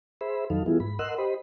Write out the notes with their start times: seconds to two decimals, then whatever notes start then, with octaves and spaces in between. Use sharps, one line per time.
0.21 G#4 C5 E5 B5
0.50 F2 D#3 F#3 D#4 A4 F5
0.66 E3 G3 B3 E4 F4 G#4
0.80 G#2 B5
0.99 A#4 D#5 F#5 C6 E6 F#6
1.18 G4 C5 D#5 B5